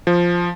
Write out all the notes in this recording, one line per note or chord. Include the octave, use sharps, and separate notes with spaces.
F3